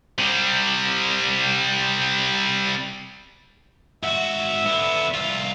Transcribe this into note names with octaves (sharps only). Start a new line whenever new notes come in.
C3 G3
G#2 F#4 E5
D3 B3
C2 F4